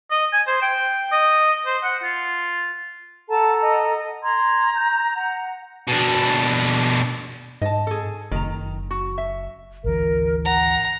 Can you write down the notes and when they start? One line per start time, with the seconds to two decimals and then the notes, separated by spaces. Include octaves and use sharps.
0.11 D#5
0.33 G#5
0.47 C5
0.62 G5
1.11 D#5
1.66 C5
1.84 F#5
2.03 F4
3.30 A4 F#5 A5 A#5
3.62 D#5
4.24 A#5 C6 G#6
4.74 G6
5.16 F#5
5.87 B2 D4
7.61 G#2 D#5 A5
7.87 G#4 A4
8.31 F#1 D#3 A#5
8.91 F#4
9.18 E5
9.84 G#1 D2 E3 A#4
10.45 F#5 A#5